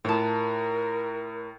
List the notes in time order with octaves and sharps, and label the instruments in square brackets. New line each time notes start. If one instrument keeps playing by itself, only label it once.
[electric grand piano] A2 [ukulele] F4 A5 [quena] A#4